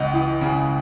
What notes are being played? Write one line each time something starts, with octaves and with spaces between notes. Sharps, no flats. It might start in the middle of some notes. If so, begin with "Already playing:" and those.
Already playing: C#2 D#5 F#5
E3
C#3